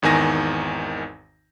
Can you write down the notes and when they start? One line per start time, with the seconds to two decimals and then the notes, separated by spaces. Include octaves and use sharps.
0.02 G#1 E2 D#3 G#5 A#6